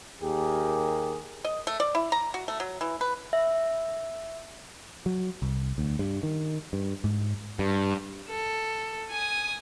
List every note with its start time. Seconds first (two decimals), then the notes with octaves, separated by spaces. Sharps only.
0.22 D#2 G4 G#4 A#4
1.45 D#5
1.67 A3
1.80 D5
1.95 E4
2.12 A#5
2.34 F#4
2.48 A3
2.60 F#3
2.81 E3
3.01 B4
3.33 E5
5.06 F#3
5.42 C2
5.78 D2
5.99 G2
6.23 D#3
6.73 G2
7.04 G#2
7.59 G2
8.30 A4
9.10 G#5 D#6